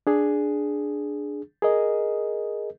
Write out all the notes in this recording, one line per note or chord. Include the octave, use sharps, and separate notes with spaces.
D4 G#4
G#4 A#4 D#5